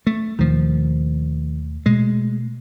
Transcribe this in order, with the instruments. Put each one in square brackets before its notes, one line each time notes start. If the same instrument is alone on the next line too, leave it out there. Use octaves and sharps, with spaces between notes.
[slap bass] A3
[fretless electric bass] D#2 B2 A3 [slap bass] D#3 F3
[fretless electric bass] B2 A3 [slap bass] G#3